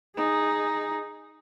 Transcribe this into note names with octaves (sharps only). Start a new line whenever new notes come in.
D#4 G#4